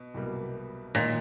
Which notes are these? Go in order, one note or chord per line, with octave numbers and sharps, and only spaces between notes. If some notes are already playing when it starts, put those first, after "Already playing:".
Already playing: B2
C2 B2 G3 A#3
A#2 D#3 G#3